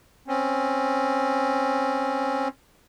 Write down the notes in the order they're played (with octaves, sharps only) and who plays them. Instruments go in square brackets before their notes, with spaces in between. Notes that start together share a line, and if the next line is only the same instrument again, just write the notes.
[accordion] C4 C#4